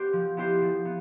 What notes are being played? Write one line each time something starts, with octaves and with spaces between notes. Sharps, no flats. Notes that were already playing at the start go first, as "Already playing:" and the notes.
Already playing: B3 G4 C5
F3
B3 E4 G4 C5
F3
B3